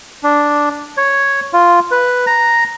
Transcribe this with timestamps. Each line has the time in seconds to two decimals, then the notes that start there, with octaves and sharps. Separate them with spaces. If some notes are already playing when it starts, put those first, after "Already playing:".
0.23 D4
0.97 C#5
1.53 F4
1.91 B4
2.27 A#5